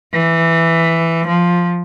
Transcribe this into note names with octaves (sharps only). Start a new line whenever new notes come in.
E3
F3